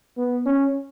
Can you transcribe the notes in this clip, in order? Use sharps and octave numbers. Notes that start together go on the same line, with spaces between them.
B3
C#4